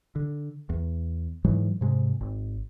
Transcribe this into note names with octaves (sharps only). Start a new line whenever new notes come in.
D3
E2
G#2 E3 F#3 G#3
G#2 C3 G#3
G#1